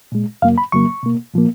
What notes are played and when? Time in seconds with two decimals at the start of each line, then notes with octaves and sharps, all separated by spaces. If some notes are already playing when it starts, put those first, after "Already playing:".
0.12 A#2 G#3
0.42 F#2 C#3 F#3 A#3 F5
0.58 B5
0.72 F2 C#3 F#3 A#3 C#6
1.03 B2 A#3
1.34 A#2 F3 A#3